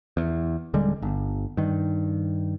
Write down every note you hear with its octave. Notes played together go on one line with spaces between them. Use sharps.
E2
D#1 D3 G3 G#3
G1
G2 D#3